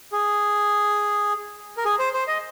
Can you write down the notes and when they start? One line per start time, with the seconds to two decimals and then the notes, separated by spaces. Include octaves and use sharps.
0.12 G#4
1.77 A#4
1.85 G#4
1.99 C5
2.14 C5
2.28 D#5